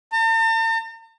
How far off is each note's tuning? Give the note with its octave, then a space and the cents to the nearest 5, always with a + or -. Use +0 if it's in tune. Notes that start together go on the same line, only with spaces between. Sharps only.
A5 +45